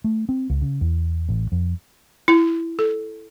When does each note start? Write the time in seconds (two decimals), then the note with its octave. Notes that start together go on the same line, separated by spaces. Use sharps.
0.04 A3
0.29 C4
0.50 C#2
0.62 C#3
0.81 E2
1.29 A1
1.52 F2
2.28 E4
2.79 A4